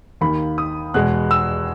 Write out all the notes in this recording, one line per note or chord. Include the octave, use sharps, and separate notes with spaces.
D#2 D#3 A#3 B5
D#6
E2 B2 G#3 F#6
E6